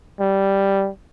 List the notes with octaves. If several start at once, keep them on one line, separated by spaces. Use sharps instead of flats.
G3